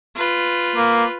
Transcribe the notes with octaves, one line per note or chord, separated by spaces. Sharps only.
F4 B4
A#3